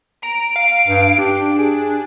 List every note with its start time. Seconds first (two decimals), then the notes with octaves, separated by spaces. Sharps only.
0.23 A#5 D7
0.56 F5
0.88 G2
1.18 D4 G4
1.58 G#4